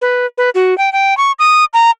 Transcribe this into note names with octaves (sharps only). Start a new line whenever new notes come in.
B4
B4
F#4
G5
G5
C#6
D#6
A#5